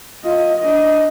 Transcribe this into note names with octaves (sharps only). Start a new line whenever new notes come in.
F4 D#5
D4 D#5